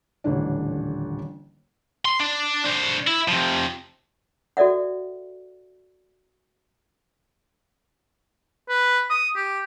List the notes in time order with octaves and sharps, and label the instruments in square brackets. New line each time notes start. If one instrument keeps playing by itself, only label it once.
[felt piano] D#1 A1 D3 D4
[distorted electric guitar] C6
D4
D4 C5
E4
C3 F3
[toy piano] F#4 A4 D5 E5 F#5
[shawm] B4
D#6
G4